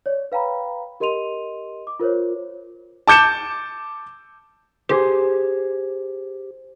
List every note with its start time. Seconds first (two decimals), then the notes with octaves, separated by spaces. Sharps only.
0.06 C#5 D5
0.32 B4 F5 G5 A#5 B5
1.00 G4 A#4 D#5 C6 D#7 F7
1.87 D6
2.00 F4 A#4 C5 C#5
3.07 A5 D6 G6 C#7 E7
4.89 G4 G#4 C5